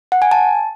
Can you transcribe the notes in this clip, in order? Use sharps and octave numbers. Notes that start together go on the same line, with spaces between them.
F#5
G#5
A5